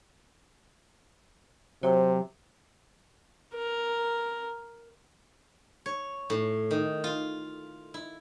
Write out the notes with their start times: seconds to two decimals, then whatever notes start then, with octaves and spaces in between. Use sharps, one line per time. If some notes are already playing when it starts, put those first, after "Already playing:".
1.83 C3 F#3 C5
3.55 A#4
5.86 C#5
6.30 A2
6.71 D#3
7.04 F4
7.94 E4